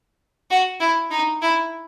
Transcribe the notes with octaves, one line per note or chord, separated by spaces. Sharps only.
F#4
E4
D#4
E4